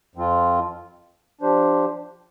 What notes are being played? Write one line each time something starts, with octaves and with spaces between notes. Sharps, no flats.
F2 F3 C4 F4
F3 D4 G4 C5